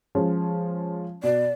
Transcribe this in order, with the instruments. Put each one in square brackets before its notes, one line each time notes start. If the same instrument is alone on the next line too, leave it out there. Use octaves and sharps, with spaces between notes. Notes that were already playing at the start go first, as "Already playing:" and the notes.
[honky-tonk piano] F3 G#3 C#4
[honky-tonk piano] B2 [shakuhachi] D5